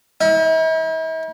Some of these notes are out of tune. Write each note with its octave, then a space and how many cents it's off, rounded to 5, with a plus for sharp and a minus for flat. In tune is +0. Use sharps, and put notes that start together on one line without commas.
E4 -45